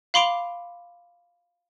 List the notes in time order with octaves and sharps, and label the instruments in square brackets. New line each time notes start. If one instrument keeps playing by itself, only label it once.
[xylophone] F5 B5 C6 D6 D7 F7